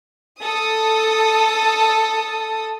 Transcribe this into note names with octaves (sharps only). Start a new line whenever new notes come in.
A4 D#6